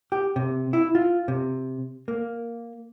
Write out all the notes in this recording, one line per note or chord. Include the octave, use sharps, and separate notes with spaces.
G4
C3
E4
F4
C3
A#3